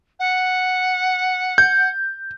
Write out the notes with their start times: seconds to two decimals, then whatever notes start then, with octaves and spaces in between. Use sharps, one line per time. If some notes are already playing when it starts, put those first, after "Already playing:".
0.19 F#5
1.58 G6